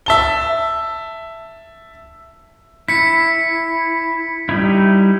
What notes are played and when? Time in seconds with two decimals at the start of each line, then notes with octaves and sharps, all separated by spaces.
0.06 E5 A5 G7
2.88 E4 B6 C#7
4.49 G3 D#4 E4